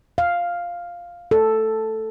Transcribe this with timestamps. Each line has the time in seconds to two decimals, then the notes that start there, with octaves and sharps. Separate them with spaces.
0.18 F5
1.31 A4